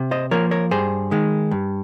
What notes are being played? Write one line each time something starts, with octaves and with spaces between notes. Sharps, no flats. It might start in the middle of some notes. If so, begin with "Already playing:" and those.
Already playing: C3
C5 D#5
F3 A#3 A#4 C#5
A#4 C#5
G2 G#4 C5
D#3 G#3
G2